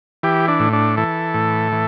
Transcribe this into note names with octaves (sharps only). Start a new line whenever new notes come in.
E3 G4
D4
A2
D4
E3 A4
A2
E3